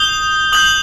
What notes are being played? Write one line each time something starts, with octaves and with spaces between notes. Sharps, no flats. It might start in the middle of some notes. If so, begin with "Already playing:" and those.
Already playing: D#6 G6 G7
D#6 G6 F#7